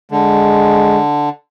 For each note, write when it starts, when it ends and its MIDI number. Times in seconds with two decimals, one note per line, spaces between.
0.12 1.29 50
0.12 1.00 56